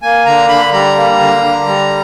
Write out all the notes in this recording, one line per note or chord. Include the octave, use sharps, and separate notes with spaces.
A#3 G#5
D3 A#5
D3 B5
G3 A#5
A#3
D3
D3
G3